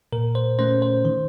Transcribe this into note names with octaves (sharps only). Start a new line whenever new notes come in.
A#2 A#4
C5
A3 C#4 C5
C5
D#3